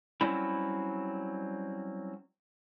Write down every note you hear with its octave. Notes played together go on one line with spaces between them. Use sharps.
F#3 G3 C4 C#4 E4